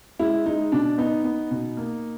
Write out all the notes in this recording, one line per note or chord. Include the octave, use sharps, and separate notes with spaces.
G#3 E4
G#3 D#4
B2 D4
B3 D#4
B3
B2
A#3